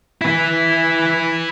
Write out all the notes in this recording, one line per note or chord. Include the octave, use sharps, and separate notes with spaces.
E4 B4